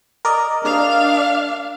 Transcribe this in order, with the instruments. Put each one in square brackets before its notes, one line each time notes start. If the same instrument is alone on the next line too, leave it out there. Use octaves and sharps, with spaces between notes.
[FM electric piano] A#4 D5 D#5
[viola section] D4 F5